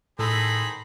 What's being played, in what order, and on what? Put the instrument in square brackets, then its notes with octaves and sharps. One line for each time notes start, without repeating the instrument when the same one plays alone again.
[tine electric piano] A2 E6 [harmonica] D#3 G#4 C5 [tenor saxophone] A4 [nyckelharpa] A#5 B5